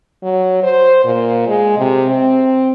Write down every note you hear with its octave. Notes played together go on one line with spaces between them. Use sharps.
F#3
C5
A#2
G#3
C3
C4